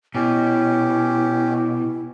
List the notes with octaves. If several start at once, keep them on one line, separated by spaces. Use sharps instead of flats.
B2 C#4 E4 G4